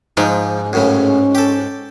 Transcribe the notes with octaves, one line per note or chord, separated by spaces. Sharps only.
G#2 F3 D#4
F#2 A2 C#3 C#4
G4 A4